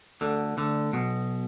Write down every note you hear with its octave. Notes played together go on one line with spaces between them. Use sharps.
D2 D3
D2 D3
B1 B2